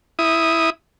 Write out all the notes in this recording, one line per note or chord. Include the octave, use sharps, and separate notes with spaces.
E4 D#6